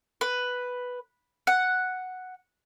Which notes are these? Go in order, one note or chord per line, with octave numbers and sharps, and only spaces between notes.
B4
F#5